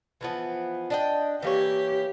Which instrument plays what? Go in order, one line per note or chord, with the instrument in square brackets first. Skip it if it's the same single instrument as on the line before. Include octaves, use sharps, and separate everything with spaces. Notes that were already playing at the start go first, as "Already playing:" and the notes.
[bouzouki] E3 F3 B3
D4 D#5 G5
[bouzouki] E3 A#3 C#5 [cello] G4